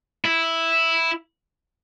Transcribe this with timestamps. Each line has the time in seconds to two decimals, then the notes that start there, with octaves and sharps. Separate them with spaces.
0.25 E4